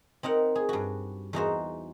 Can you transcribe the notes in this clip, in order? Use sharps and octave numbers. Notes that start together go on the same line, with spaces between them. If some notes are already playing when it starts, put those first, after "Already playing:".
C4 D#4 A#4 F#5
G#4
G2 F#4
E2 D#4 F#4 C5